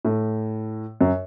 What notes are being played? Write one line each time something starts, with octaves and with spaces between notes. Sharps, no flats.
A2
F#2